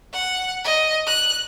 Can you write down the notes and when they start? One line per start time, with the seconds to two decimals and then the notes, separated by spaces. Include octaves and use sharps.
0.13 F#5
0.65 D#5
1.07 F#6